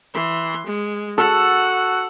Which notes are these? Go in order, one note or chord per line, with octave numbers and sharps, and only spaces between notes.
E3 C6
G#3
F#4 A4 F#5